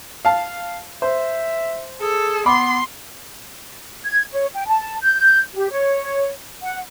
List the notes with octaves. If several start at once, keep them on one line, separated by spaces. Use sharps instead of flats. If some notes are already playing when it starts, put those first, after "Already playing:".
F5 A5
C5 E5
G#4 A4
B3 B5 C6 D6
G#6
C#5
G5
A5
G6
G4
C#5
F#5